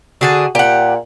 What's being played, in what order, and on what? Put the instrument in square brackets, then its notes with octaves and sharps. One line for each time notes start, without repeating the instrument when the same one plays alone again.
[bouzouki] D3 G#4 A5 [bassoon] F#4
[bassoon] A#2 [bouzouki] G4 F#5